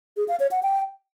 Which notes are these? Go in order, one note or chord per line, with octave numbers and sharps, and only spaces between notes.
G#4
F5
C#5
F#5
G5